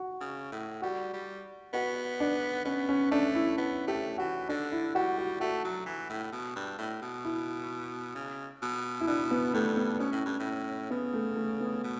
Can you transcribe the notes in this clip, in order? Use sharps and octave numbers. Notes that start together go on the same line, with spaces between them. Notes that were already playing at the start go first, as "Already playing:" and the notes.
Already playing: F#4
C#3
A2
G3 F#4
G3
B3 F#4
D4
B3 C#4
C#4
A3 D4
E4
B3
A3 G4
E3 F#4
D3 D4
E4
G3 F#4
F#4
A3 F#4
F#3
E3
A2
B2
G2
A2
B2
E4
C#3
B2
E4
B2 D4
B3
G2 A3
B3
B2 C#4
A2
G2
A2
C#3 B3
A3
A3
B3
B2